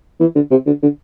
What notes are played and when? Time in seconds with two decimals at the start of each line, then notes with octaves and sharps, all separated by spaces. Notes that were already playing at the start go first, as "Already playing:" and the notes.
0.20 E3
0.35 D3
0.51 C3
0.66 D3
0.82 D3